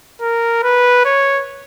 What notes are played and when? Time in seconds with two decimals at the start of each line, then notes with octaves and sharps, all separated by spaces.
0.21 A#4
0.63 B4
1.05 C#5